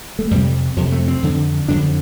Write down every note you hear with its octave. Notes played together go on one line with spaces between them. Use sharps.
A3
F2 C3 G3
F2 C3 F3
A3
C4
F2 D3
F2 D3 D4